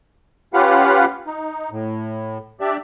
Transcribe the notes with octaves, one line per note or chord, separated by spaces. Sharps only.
C#4 F4 G4 B4 F5 F#5
D#4
A2
D4 G4 D5 E5